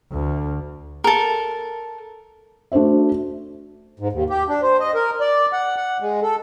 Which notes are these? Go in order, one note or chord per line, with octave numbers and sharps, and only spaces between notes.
D2
A4 A#4
A3 D4 F#4 C5 E5
G#2
D#2
G4
D4
C5
D#5
A#4
D5
F#5
F#5
G#3
A4